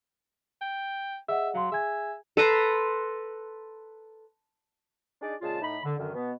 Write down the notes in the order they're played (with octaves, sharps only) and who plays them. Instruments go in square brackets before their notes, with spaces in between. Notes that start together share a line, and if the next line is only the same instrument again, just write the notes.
[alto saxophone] G5
[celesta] G#4 D#5 F#5 [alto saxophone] E5
[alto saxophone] F#3 [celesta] F5 C6
[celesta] G#4 G#5 G#6 [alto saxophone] E5
[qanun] A4 B4 A#5 C6
[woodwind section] D4 D#4 G#4 D5
A#2 C#3 G#3 F4 G#4 A5
A2 D#4 B5
D3
F#2 D3 D#3
B2 B3